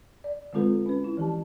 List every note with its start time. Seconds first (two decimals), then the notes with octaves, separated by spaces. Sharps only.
0.24 D5
0.53 D3 G#3 C4 F4 A4 B4
0.86 C#4 B4
1.04 E4
1.17 E3 F3 G4 A5